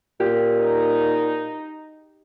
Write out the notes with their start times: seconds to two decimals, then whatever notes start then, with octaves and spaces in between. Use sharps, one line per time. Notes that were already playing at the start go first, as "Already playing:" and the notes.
0.20 A#2 G4
0.58 D#4